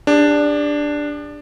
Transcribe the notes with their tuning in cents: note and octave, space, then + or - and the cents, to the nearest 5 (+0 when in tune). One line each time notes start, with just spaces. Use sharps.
D4 +0 G4 +45